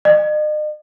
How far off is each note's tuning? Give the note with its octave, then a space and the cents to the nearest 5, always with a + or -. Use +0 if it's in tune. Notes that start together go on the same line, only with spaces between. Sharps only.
D#5 -40